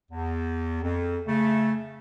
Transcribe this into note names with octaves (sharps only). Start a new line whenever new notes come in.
E2
F2
C#3 A3